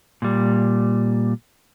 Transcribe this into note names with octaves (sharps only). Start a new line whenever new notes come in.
A#2 G3